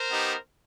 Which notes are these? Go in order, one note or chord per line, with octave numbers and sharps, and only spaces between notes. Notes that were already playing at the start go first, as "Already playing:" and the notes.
Already playing: A#4 C5
B3 D#4 G4